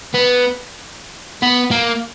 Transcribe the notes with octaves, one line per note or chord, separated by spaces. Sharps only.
B3
B3
A#3